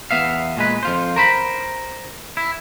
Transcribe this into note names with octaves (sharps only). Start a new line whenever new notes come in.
E2 B3 E5 F5
A#2 G#3 B4
F2 F4 C5
A#4 C5 B5
E4